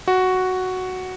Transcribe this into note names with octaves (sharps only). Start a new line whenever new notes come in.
F#4